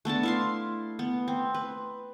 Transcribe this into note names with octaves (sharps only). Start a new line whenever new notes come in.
A3 B3 D4 A5
E4 F5 C6
B3
C4
B4